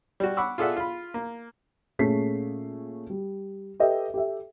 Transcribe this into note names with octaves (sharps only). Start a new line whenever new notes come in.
G3 F#4
F#5 B5 C#6 D6 E6
F4 G#4 A4 D5 E5 F#5
F4 B5
A#3
A#2 A3 C#4 G#4 B6 C7
G3
G4 A4 B4 D#5 E5 G5
G4 A4 E5